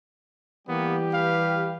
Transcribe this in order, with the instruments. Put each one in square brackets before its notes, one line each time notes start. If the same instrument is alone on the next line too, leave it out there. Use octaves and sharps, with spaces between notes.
[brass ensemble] E3 G3 G4 [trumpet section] A#3 B3
[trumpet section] B4 F5